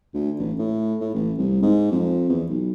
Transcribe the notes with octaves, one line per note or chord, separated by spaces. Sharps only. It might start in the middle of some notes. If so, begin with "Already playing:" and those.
D2
A1
A2
A2
A1
C2
G#2
F2
E2
B1